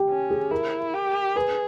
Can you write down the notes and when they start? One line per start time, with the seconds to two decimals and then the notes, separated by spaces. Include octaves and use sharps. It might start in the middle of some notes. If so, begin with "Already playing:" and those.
Already playing: G4
0.09 C#4
0.30 G#4
0.51 E4 A#4
0.94 G4
1.36 G#4 B4